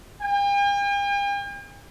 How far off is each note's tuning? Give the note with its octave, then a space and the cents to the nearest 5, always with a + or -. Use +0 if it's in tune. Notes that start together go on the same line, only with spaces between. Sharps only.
G5 +45